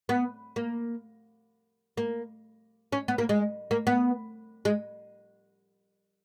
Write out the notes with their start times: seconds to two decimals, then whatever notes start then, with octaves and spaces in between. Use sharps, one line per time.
0.09 B3
0.56 A#3
1.97 A#3
2.92 C#4
3.08 B3
3.18 A#3
3.29 G#3
3.71 A#3
3.87 B3
4.65 G#3